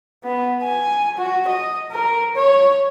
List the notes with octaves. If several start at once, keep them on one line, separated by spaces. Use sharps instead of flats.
B3
G#5
F#4
D#5
A#4
C#5